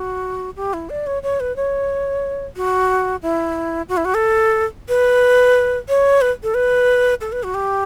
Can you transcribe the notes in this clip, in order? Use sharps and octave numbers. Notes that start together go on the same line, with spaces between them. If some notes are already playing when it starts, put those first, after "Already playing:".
Already playing: F#4
G4
E4
D5
C#5
C#5
B4
C#5
F#4
E4
F#4
E4
F#4
A4
B4
C#5
B4
A4
B4
A4
B4
F#4
G4